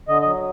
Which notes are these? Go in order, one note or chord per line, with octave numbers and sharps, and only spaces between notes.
D3 D#5
F#3 D#5